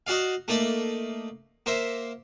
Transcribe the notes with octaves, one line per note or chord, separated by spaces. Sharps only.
D#4 F#4 D5 F5
A3 A#3 D#4 D5
A#3 C5 E5